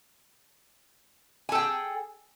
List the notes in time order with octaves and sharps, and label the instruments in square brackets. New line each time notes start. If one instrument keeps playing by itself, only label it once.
[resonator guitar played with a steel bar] G#5
A4
G5
G#4